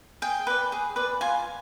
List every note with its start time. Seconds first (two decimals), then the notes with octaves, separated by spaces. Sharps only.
0.22 G#4 G5
0.47 B4 D5
0.72 G#4
0.96 B4 D5
1.21 F4 G#5